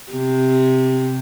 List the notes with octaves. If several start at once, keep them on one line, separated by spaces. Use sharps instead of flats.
C3